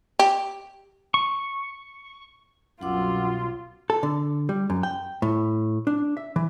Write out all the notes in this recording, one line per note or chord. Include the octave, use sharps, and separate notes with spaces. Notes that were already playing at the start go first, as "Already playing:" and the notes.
G4
C#6
C2 F#2 B2 F#3 F4 F#5 D6 E6
A4
D3
G3
F#2
G5
A2
D4
E5
E3